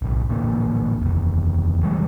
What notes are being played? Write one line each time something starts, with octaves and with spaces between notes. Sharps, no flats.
D1 B1
A1 A#2 D3 A#3
F1 D#2
C#3 E3 G3 G#3